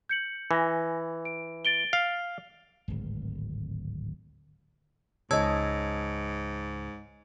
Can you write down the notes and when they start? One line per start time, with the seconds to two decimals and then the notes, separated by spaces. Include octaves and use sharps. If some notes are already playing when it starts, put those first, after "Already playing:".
0.09 G6 C#7 F#7
0.51 E3 G#5 A#6
1.25 D7
1.65 A6 D7 G7
1.93 F5
2.88 D1 G#1
5.31 C#2 G#2 C#5 D#5 A5 E6 G#6